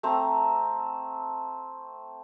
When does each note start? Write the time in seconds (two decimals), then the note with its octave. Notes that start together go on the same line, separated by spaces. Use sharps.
0.03 A3 C4 C5 A#5